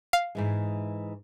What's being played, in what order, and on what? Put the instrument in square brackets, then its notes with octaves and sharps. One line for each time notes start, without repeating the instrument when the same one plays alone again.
[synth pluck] F5
[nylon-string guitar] G#2 E3 G#3